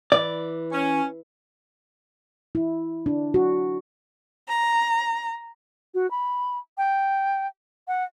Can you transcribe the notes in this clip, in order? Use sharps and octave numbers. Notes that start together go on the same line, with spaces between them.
E3 D5
C#4
E4
D4
F#4
A#5
F#4
B5
G5
F#5